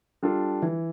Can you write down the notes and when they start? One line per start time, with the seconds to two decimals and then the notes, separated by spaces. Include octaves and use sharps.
0.23 G3 D4 F4 A4
0.62 E3